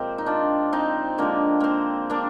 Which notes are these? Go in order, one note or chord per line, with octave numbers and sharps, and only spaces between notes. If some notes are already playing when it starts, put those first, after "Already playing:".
Already playing: A#2 F3 G#3 C4 G4 A#4
D#4
D4 F4
C4 D#4
D3 F3 G#3 A#3 D4
A#3 C4
A#3 D4